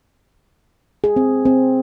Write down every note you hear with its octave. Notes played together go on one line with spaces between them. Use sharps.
G#4
C4
C4